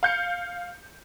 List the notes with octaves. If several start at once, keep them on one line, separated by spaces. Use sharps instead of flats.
F5 G6 C#7